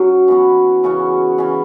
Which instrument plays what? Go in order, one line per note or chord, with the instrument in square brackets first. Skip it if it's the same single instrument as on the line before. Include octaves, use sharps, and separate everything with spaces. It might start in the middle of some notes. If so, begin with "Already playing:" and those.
Already playing: [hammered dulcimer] F#3 C#4 F#4
E3 B3 F#4
C#3 E3 C#4 F#4
C#3 E3 C#4